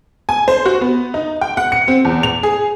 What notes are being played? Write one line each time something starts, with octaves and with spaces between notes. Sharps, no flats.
G#5
C5
F#4
B3
D#4
G5
F#5
C#7
C4
E2
F7
G#4